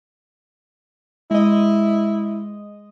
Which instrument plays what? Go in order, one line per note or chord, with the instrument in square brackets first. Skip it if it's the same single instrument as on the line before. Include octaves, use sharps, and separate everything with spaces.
[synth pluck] G#3 D#5 [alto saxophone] E4